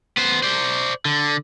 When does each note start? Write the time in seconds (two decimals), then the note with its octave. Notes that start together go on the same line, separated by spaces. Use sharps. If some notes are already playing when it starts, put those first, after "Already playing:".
0.17 B3 C5
0.43 C5 D5
1.05 D3